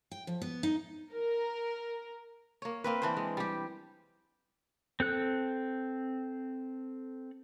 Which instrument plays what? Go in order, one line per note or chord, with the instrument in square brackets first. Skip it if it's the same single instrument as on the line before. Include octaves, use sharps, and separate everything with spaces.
[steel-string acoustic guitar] G5
F3
B3
D#4
[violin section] A#4
[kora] A#3 C#5
A#3 C4 B4
E3 D4 C5
G#3
G3 G4
[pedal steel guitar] C4 A4 F#6